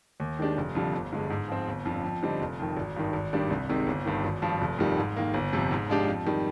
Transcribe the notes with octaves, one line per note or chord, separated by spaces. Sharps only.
D#2
D#3 G#3 D4 G4
F1
F2 D3 G3
G1
G2 D3 G#3
G#2
F3 C4
G1
F2 D3 F3
F2
D3 G3 C4 D#4
F1
F2 D#3
G#1
G2 D#3
G#1
G2 D#3 G3 D4
C2
C3 D#3 G#3
G1
G2 D#3
G#1
G2 F3
F1
F2 D#3 G3
G#2
D#3 A#3
G1
F2 C3
G#2
F3 G#3 D4 G4
F2
D#3 G3